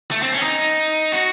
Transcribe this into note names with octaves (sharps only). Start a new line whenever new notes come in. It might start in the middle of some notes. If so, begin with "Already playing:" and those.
A3
C4
C#4
D#4
F#4